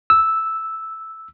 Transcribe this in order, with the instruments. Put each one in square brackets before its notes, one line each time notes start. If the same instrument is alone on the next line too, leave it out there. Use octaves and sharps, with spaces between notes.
[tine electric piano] E6